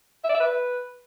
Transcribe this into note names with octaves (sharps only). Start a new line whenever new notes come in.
E5
D5
E5
B4